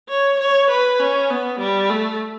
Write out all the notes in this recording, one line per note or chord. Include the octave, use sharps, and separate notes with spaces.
C#5
C#5
B4
C#4
B3
G3
A3